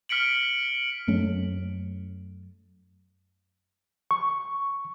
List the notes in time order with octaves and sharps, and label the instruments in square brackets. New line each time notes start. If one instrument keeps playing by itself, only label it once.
[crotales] F6 B6 C#7 D7 F#7
[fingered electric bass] F#2 A3 C#4
[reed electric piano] C#6